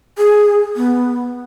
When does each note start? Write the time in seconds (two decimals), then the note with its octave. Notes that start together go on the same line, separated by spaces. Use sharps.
0.18 G#4
0.76 B3